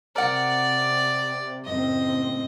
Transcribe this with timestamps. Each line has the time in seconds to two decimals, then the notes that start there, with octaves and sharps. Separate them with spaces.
0.16 C3 A#4 D5 F#5
1.65 F#1 A2 C4 D#5